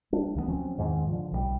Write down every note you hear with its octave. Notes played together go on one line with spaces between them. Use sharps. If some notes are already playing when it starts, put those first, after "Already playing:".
G3 D4
D2 E3 F#3 B3
F3 F#3 C4 C#4
E2 G#2 D#3 C4
D3 F3
B1 E3 G3